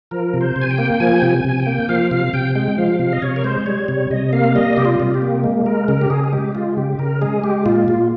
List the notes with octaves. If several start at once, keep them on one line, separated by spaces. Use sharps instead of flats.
F3 A#4
C3
C5
C3
G#5
G5
A#3
F3 G#5
C3 G5
G#5
C3 G#5
G5
A#3
F3 F5
C3 F5
C3 G5
G#3 G5
F3 F5
C3 F5
D#5
C3 C#5
A#4
G#3 C5
G3 C#5
C3 C#5
C3 D#5
A#3 F5
G3 D#5
C3 G4
F4
C3
G4
A#3
G#3
G#3 A#4
C#3 A#4
G4
C#3 G#4
G#4
G#3 G4
G#3 F4
C#3 G4
C#3 A#4
G#3 G#4
G#3 G4
A#2 F4
A#2 F4